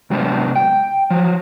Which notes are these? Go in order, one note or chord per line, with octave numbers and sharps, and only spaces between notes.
G#2 C3 F#3 G#3 B3 D4
G5
F3 F#3